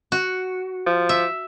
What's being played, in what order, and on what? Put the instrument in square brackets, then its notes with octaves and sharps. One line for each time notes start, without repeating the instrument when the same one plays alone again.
[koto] F#4
[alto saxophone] F3
[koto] E5